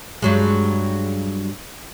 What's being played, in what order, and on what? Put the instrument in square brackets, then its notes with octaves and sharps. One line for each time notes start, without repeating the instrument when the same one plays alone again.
[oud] G2 F#3 G#3